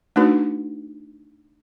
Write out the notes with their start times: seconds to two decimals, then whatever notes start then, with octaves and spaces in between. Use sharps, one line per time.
0.16 A3 D4 D#4 F#4 B4